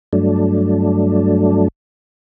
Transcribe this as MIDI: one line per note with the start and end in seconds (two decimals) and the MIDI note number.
0.13 1.68 43
0.13 1.68 54
0.13 1.68 57
0.13 1.68 62